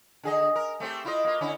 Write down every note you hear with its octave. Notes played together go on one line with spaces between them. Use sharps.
D3 G#4 D#5
A#4
A3 C4 G4
E4 F4 D#5
A#3 F4
D3 C#4 E4